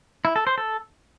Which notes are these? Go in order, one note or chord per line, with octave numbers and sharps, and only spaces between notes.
E4
A4
C5
A4